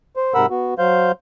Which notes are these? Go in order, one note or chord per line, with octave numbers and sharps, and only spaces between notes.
C5
G#2 C3 A#4 F#5 B5 E6
B3 F#4
F#3 C5 F5 G6